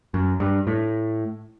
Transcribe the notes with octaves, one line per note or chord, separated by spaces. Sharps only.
F#2
G2
A2